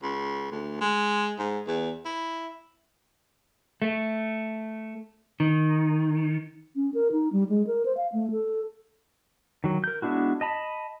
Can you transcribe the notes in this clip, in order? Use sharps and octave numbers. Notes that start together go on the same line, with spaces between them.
C#2
D2
G#3
G#2
E2
E4
A3
D#3
C#4
A#4
D#4
G3
G#3
A#4
C5
F5
A3
A4
D#3 F#3
A#4 G6
G#3 B3 D4 E4 F#4
D#5 A5 B5